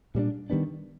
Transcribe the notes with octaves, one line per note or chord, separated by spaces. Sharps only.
A#2 G3 B3 D4
D#3 G3 B3 D4